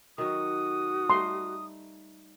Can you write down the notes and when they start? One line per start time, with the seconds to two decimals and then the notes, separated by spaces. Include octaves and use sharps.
0.18 D#3 F#3 F#4 D#6
1.10 G3 A3 D#4 C6